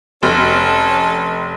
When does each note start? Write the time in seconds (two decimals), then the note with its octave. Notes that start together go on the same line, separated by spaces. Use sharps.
0.23 F1 C#4 A4